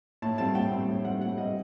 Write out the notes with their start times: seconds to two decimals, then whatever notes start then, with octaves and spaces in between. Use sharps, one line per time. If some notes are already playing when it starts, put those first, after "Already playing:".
0.22 A2 A5
0.38 G3 C4 A5
0.55 A2 G5
0.72 G3 C4
0.89 A2
1.05 G3 C4 F#5
1.21 A2 F#5
1.38 G3 C4 D#5